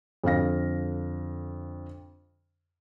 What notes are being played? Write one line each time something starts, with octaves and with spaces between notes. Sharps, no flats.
F2 D3 F5 A#6